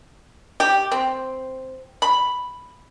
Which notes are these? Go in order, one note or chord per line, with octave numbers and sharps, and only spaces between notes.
G4
C4
B5